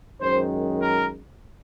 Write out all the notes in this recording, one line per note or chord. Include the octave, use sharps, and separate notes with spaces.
F#2 D#3 G#3 C5
A#4